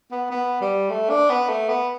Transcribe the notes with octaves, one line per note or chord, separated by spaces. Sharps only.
B3
B3
G3
A3
D4
B3
A3
B3